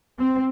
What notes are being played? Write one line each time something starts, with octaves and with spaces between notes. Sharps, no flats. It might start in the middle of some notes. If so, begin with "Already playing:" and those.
C4